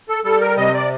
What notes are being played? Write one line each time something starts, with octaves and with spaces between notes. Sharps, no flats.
A4
G3 A4
A#4
C3 D#5
D5